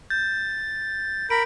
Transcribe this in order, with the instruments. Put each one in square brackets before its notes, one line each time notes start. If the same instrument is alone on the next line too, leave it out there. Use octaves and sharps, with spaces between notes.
[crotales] G6 [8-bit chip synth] A6
[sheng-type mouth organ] A#4 B5 [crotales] D7